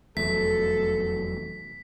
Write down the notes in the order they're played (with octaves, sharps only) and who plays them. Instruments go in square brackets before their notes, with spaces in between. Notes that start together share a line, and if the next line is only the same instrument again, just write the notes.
[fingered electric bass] F1 E2 [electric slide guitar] F#3 A3 [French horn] A4 [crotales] B6